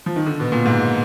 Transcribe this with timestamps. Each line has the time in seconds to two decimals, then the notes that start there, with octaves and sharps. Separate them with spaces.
0.06 F3
0.16 D#3
0.26 D3
0.40 B2
0.52 A#2
0.65 G#2